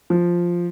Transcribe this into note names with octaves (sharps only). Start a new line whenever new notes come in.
F3